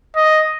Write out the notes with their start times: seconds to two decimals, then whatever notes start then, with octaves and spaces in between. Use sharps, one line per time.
0.16 D#5